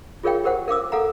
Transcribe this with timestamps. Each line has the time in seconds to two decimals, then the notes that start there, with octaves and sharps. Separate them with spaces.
0.23 F4 G#4 A#4 C#5 F5 G5
0.44 G4 A#4 C5 F#5
0.68 A#4 F5 D6 E6
0.92 A4 F5 F#5 A#5